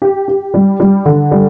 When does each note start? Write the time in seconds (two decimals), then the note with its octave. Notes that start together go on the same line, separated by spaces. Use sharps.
0.02 G4
0.28 G4
0.54 G3
0.80 G3
1.05 D3
1.31 G3